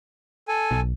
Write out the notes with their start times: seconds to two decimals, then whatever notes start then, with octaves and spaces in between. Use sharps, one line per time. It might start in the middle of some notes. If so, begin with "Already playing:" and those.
0.48 A4 G#5
0.71 B1